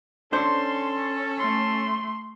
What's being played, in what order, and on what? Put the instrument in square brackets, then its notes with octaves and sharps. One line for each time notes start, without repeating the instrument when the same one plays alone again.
[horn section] C#4 A4 [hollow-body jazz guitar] D4 C5 [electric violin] C6
[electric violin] A3 C6